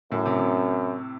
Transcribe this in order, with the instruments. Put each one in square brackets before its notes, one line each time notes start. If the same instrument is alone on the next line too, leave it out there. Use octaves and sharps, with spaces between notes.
[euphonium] F#2 [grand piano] A2
[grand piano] C3
C3